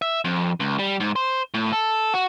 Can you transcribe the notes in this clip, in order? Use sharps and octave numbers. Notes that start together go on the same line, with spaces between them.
E5
F2
C#2
G3
G#2
C5
A2
A4
F#4